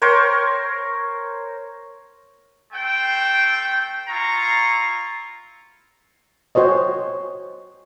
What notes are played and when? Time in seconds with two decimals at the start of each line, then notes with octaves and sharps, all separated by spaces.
0.02 A#4 C5 C#5 G5
2.73 A3 C4 G5
4.08 E4 F4 A#5 C#6
6.55 F#4 C5 C#5 D#5